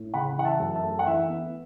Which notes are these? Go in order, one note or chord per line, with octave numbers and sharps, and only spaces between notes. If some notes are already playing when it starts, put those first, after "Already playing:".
Already playing: A2
C#3 F#5 B5
E3 F#5
E5 A5
F#2
E5 A5
A3
F#5
E3 E5
B3